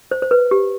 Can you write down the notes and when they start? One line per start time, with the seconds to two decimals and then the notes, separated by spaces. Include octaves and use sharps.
0.11 C5
0.22 C5
0.31 B4
0.51 G4